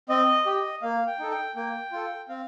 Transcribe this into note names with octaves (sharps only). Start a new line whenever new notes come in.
C4 D#5
G4
A#3 F5
G5
D#4 A4
G5
A#3 G5
F4 A4
C4 F5